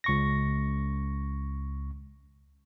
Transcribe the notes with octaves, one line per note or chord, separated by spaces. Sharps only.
C#2 C#6 A#6